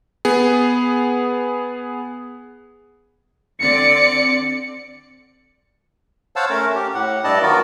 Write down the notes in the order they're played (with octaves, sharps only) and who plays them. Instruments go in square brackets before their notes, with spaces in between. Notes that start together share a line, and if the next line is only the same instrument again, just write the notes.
[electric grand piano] B3 G#4
[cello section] D3 C4 D5 [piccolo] C#7
[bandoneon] C5 C#5 F5 F#5 A5 E6
A3 C#4 A#4
G4
A2 F#5
G2 E4 D5 D#5 A5
D#3 F#3 B3 F4 F#4 A#4